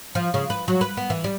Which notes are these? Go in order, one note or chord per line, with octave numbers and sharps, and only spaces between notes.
F3
C#3
B4
F#3
B4
B3
E3
G3